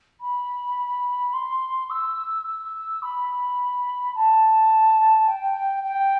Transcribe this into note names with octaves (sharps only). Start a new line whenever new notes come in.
B5
C6
E6
E6
B5
A5
G5
G5